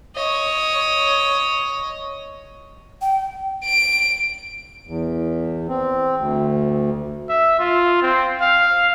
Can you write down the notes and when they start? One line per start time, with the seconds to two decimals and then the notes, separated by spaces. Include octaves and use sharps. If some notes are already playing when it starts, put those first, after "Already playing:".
0.15 C#5 D#5
3.01 G5
3.65 D7
4.87 E2
5.69 C4
6.18 D2
7.29 E5
7.59 F4
8.02 C4
8.41 F5